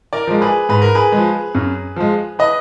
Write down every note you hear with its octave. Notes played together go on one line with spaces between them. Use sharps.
A#4 D5
F3 G#3
G#4 B4
G#2 B4
A#4
G#4 B4
F3 G#3
F#2
F3 G#3
B4 D#5